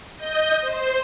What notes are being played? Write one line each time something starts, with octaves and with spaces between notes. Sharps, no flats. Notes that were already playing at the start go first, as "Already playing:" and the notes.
D#5 G6
C5